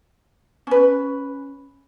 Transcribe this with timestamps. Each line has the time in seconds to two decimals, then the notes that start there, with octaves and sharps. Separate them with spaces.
0.67 C#4 B4